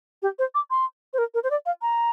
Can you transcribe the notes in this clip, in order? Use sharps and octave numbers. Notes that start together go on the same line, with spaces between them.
G4
C5
D6
C6
C5
A#4
A#4
C5
D5
F5
A#5